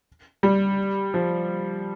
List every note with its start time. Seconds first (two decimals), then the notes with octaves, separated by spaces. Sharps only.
0.43 G3
1.14 F3